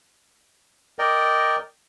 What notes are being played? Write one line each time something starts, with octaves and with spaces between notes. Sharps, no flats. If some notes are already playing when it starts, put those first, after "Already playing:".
A#4 D5 D#5 G5